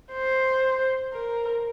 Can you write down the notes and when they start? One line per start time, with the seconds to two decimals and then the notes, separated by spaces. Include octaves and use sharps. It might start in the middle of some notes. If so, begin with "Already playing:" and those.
0.13 C5
1.13 A#4